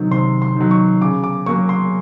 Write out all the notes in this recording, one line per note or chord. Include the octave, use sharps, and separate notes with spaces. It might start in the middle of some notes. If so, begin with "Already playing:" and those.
Already playing: C3 D#3 F#3
C3 C6
C6
D#3 F#3
C#6
C#3 D6
D6
F#3 A#3 C#6
C6